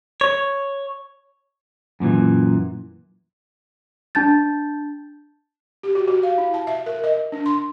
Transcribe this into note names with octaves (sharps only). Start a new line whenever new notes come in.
C#5
F#2 A#2 D#3 E3
D4 A5 G6 A6
G4
F#4
F#4
F5
E4
A5
E5
A#4
D#5
D4
C6